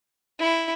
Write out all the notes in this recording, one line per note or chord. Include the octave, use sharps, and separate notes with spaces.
E4